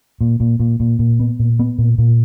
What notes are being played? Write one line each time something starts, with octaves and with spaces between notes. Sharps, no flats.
A#2
A#2
A#2
A#2
A#2
B3
A#2
B3
A#2
A#2